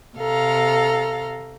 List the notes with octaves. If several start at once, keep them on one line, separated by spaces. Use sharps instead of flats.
C3 A4 F5 A#5